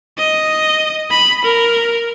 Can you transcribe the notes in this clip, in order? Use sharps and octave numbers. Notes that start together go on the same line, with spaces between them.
D#5
B5
A#4